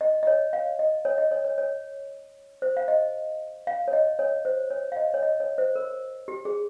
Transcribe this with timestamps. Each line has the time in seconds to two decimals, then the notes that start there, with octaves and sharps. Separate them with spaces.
0.01 D#5
0.23 D#5
0.27 C#5
0.53 F5
0.79 D#5
1.05 C#5
1.18 D#5
1.31 C#5
1.45 C#5
1.58 C#5
2.62 C5
2.77 F5
2.88 D#5
3.67 F5
3.88 C#5
3.93 D#5
4.19 C#5
4.45 C5
4.70 C#5
4.92 F5
4.97 D#5
5.14 C#5
5.23 D#5
5.40 C#5
5.58 C5
5.75 A#4
6.28 G4
6.45 G#4